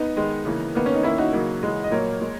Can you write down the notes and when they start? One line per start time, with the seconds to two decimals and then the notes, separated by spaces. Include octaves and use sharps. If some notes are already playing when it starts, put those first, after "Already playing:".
Already playing: B3 D#4
0.16 D#3 G#3
0.45 C#3 E3 A#3
0.75 D#3 A#3 B3
0.86 C#4
0.94 D#4
1.03 D#3 A#3 C#4 E4
1.18 D#4 F#4
1.33 C#3 F#3 A#3
1.63 C#3 E3 G#3
1.84 D#5
1.91 A#2 F#3 A#3 A#4 C#5
2.21 A#2 G#3